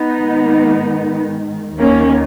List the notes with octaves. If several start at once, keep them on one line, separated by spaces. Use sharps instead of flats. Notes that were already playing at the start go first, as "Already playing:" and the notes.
Already playing: B3 D#4
G#2 D#3
D#2 D#3 A#3 C#4